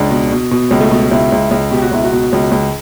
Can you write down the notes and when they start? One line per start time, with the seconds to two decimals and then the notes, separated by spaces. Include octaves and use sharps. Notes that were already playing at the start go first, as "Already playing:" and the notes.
Already playing: C#2 D4
0.11 B2
0.31 B2
0.51 B2
0.71 C#2
0.81 A3
0.91 B2
1.11 C#2 E4
1.32 C#2
1.51 C#2
1.71 B2 G4
1.82 F#4
1.91 C#2 E4
2.04 F#4
2.12 B2
2.33 C#2
2.51 C#2